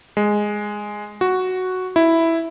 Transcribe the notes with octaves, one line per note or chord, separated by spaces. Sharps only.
G#3
F#4
E4